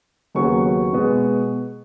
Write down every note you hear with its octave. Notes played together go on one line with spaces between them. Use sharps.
D#2 C#3 F#3 B3 C#6
B2 G#3 B3